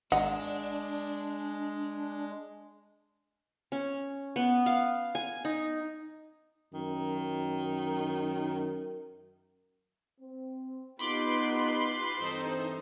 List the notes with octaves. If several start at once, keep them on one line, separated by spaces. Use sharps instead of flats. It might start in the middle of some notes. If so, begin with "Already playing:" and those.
G#1 G#3 D4 D#5 F#5 A#5
C#4
B3
F5
G#5
D#4
F#2 D#3
C4
B3 D#4 F4 G4 B4 B5 C6 D6
G2 E3 C4 D#4 A4 C5